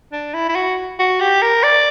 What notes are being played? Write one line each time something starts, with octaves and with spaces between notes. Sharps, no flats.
D4
E4
E4
F#4
F#4
G4
A#4
D5